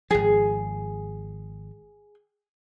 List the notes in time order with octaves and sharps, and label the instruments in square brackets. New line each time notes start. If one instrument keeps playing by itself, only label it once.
[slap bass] G#1 F3 [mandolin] G#4